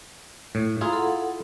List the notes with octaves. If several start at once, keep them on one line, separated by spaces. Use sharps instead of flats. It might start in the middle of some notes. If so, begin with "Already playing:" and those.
A2
E4 F4 G#4 F5 A#5 C6
A4 F#5